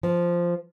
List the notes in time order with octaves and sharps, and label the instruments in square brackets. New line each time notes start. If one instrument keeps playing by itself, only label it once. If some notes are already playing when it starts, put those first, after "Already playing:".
[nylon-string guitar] F3